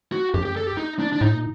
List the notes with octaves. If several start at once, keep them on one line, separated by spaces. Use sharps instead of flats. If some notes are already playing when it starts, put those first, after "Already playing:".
F#4
F#2 G4
G4
A4
G4
D#4
D4
D4
A2 D#4
A#2